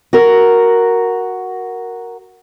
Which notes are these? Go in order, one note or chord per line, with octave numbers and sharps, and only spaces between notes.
F#4 A#4